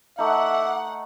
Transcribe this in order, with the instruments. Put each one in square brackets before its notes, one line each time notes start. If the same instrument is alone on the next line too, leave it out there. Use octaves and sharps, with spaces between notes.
[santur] A3 D#4 [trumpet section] E5 D6 [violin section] F#5